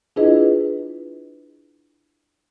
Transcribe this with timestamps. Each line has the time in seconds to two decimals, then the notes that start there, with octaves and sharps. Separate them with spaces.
0.16 D4 E4 F4 G#4 B4 D#5